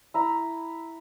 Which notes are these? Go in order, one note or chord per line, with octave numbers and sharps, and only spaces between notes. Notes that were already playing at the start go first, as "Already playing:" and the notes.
E4 A#5